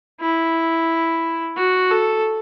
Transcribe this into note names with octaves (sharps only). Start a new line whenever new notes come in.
E4
F#4
A4